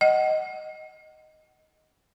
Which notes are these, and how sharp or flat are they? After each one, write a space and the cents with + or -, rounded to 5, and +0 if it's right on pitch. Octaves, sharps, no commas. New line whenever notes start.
D#5 +0 F#5 +20